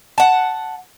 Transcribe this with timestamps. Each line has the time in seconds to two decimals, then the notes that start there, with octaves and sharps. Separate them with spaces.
0.18 F#5 A5